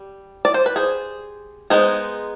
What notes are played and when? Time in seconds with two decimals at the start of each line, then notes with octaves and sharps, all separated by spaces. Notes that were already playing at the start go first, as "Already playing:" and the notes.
Already playing: G3
0.45 D5
0.54 C5
0.66 B4
0.76 G#4 C5
1.70 G#3 B3 D#4 G#4 C5